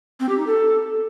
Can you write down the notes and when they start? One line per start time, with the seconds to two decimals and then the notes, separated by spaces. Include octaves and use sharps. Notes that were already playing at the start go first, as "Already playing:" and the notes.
0.20 C4
0.29 G4
0.38 D#4
0.47 A4